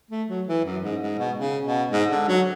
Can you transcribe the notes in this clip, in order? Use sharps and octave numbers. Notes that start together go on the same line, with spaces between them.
A3
F#3
E3
F#2
G#2
G#2
B2
C#3
B2
G#2
D3
F#3